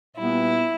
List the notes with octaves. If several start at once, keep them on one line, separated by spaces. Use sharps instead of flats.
A#2 G3 B3 E4